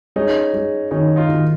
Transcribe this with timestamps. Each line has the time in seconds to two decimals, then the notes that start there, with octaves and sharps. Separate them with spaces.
0.16 G#3 C#4 D#4
0.54 G#3
0.91 D#3 C#4 D#4
1.16 D#4 F4
1.29 D#3